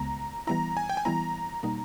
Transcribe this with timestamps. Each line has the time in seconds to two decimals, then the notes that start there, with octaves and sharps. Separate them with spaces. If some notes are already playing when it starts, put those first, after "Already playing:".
Already playing: C#2 C#3 G#3 B3 A#5
0.47 E3 G3 B3 E4 A#5
0.77 G#5
0.90 G5
0.97 G#5
1.05 E3 G3 B3 E4 A#5
1.63 B2 G3 A#3 D#4